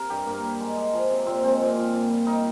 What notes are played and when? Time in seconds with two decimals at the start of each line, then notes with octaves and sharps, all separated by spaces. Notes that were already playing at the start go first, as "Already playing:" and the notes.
Already playing: C3 A#4
0.10 G2 G4
0.26 G2 A#3
0.43 G3
0.60 G#3
0.77 G#3
0.93 F3
1.11 C3
1.26 A#2 C4
1.44 G#3 C4
1.60 A#2
1.76 A#2
1.93 A#2
2.10 G3
2.26 G3 D#4